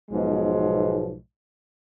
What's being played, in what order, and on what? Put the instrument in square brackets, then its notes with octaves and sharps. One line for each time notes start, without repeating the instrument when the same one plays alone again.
[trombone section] B1 G#2 B2 F3 G#3